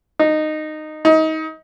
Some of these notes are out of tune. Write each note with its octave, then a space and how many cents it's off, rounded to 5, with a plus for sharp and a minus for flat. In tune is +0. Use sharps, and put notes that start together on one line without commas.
D#4 -15
D#4 +25